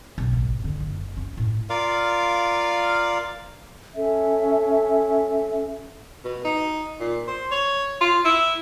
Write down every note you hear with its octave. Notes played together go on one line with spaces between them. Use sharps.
B1
G#1
D3
F#1
C#4
A2
F4 A#4 D5 F5
C#4 A4 E5
B2
D#4
A#2
C5
C#5
F4
E4